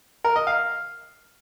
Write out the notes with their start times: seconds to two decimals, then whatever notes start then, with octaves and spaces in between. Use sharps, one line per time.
0.24 A#4
0.36 D#5
0.47 F5